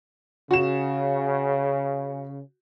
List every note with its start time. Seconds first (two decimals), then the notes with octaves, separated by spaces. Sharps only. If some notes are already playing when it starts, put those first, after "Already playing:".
0.51 C#3 F#4 E7